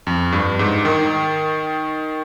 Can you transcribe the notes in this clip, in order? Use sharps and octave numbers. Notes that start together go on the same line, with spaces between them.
F2
G2
G#2
D#3